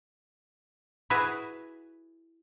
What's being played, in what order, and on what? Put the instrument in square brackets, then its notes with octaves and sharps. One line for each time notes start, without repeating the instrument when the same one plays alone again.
[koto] E4 F#4 G#4 B4 E5